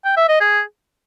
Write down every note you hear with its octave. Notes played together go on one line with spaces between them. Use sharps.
G5
E5
D#5
G#4